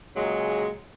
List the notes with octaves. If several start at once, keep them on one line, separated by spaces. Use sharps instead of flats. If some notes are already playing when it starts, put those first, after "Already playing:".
A#2 C#3 F#3 G#3